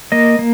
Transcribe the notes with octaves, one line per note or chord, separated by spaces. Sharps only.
A#3 D#5
A#3